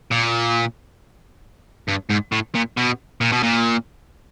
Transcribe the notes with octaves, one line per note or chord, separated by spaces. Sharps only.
A#2
G2
G#2
A2
A#2
B2
A#2
B2
A#2